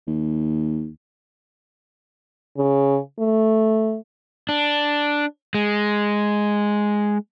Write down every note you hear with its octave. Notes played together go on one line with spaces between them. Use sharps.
D#2
C#3
A3
D4
G#3